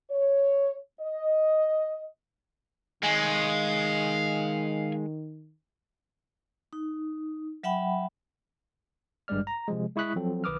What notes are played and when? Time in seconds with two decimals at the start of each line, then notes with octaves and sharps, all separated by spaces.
0.10 C#5
1.01 D#5
3.03 D#3 G#3 F5 G#5
6.73 D#4
7.63 F#3 E5 F#5 G5 B5
9.28 G#1 G2 G3 G#3 D5 F6
9.47 A#5
9.68 C3 F3 G#3
9.96 G#3 E4 C#6 D#6 F#6 B6
10.16 F3 F#3 C4 A4
10.44 B1 D#3 B4 D6 D#6 F6